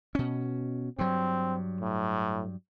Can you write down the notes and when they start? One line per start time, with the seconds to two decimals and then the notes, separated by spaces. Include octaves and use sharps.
0.15 B2 C#4
0.99 G2 F#3 C4
1.81 A2